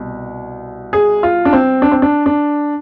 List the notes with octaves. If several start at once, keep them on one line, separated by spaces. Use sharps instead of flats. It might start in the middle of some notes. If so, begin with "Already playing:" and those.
Already playing: C2 B2
G#4
F4
D4
C4
D4
C4
D4
D4